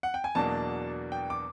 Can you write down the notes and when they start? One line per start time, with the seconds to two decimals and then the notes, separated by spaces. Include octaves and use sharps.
0.03 F#5
0.14 G5
0.24 G#5
0.35 E2 B2 F#3 A#3 D4 A5
1.12 G5
1.30 D6